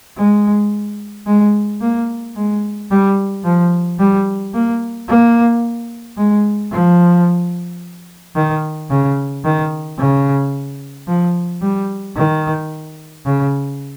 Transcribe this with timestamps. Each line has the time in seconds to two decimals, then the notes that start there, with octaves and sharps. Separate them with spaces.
0.17 G#3
1.26 G#3
1.81 A#3
2.36 G#3
2.90 G3
3.44 F3
3.99 G3
4.54 A#3
5.08 A#3
6.17 G#3
6.71 F3
8.36 D#3
8.90 C#3
9.44 D#3
9.98 C#3
11.07 F3
11.61 G3
12.16 D#3
13.26 C#3